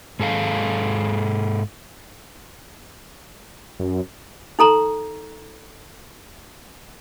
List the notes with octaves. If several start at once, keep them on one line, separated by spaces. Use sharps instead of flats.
G#2 G#4 A4 F5
F#2
D#4 A4 A#5 C6